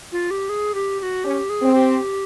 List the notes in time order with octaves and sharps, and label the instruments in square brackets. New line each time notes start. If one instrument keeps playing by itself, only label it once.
[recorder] F4
G4
G#4
G4
G4
F#4
[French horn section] C#4 [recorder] G4
[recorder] G#4
[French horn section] C4
[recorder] G4